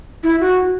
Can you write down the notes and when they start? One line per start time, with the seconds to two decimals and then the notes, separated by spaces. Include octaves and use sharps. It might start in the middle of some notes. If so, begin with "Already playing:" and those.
0.23 E4
0.41 F#4